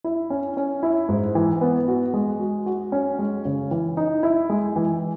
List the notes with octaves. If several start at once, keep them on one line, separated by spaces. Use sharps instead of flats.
E4
C#4
C#4
E4
G#2
E3
B3
F#4
G#3
F#4
F#4
C#4
G#3
C#3
E3
D#4
E4
G#3
E3